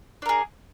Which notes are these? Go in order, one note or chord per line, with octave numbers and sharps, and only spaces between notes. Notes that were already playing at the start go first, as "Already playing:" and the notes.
D4 G#4 A#4